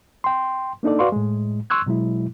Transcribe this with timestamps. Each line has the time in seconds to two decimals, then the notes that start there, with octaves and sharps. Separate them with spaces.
0.24 G5 C6
0.83 A#3 D4 D#4 A4 D5
0.99 F#4 B4 D5 F5 C6 C#6
1.12 A2 G#3
1.70 C6 C#6 E6 F#6 G#6
1.86 B2 F#3 G#3 E4